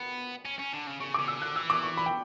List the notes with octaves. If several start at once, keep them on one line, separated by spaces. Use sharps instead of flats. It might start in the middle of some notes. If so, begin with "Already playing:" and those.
Already playing: B3 B5
C#4
C#4
D3
C#3
C#3 C#6
C#3 D6
E6
D3 F#6
E3 E6
D6
C#6
B5
G5